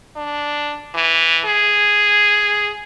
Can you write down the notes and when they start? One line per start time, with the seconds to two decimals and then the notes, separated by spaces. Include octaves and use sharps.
0.16 D4
0.95 E3
1.45 G#4